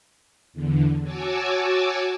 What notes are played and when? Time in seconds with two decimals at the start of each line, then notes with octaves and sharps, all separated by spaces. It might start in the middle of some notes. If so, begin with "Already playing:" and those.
0.53 E2 D3
1.02 F#4 C#5 G#5 A5 D6 E6